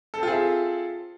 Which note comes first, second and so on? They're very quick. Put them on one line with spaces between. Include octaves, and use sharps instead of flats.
A4 C4 F4 G#4 E5